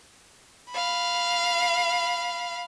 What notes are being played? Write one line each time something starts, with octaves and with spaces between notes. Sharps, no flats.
F5 B5